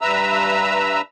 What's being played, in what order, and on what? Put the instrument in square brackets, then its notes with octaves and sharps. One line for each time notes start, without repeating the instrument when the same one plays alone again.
[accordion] G2 B4 E5 A#5 E6